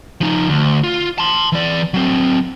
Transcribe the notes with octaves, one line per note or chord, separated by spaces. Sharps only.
F3 D#4
D2
F4
A5 C6
E3 D5
F#3 C4